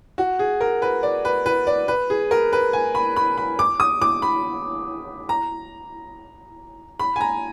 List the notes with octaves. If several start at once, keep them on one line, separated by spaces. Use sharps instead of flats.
F#4
G#4
A#4
B4
D5
B4
B4
D5
B4
G#4
A#4
B4
G#5
B5
B5
B5
D6
D#6
D6
B5
A#5
B5
G#5
A#5